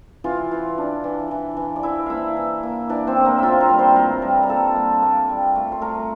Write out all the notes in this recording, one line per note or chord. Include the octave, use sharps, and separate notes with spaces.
E3 F4 F5
E3
D4
E3
E3
E3
D5
E3 E4 E5
A#3 E4 E5 F5
E3
A#3
E3 D4 D5
C4 C5
A2
A#3 A#4
C4 F4 E5 F5
A#4 A#5
G3
C5 C6
A2 A#4 A#5
G3
A#5
A#3 A4 A5
A#3
A#3
G3
A3
C6
A3 A#4 A#5